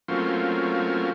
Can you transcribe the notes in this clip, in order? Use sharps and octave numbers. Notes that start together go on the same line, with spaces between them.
F#3 A3 A#3 C4 C#4 F4